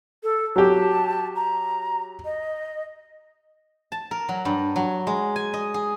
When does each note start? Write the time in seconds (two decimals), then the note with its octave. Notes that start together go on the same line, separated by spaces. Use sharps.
0.23 A4
0.56 F#3 G4 A5
1.36 A#5
2.25 D#5
3.92 A5
4.11 A#4
4.29 F#3
4.45 G2
4.76 F#3
5.07 G#3
5.36 G#5
5.54 D#5
5.74 G#4